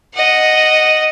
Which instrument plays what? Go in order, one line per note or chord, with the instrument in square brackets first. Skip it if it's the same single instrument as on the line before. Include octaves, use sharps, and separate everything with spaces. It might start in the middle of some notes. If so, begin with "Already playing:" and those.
[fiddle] D#5 F#5